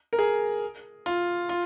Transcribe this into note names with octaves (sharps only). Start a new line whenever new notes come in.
A#4
G#4
F4
F4